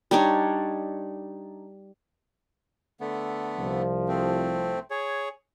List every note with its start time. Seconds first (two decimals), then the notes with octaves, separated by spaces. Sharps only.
0.11 G3 D4 D#4 C#5
3.00 D3 A3 B3
3.58 C2 F3
4.08 A3 C4
4.90 G#4 C#5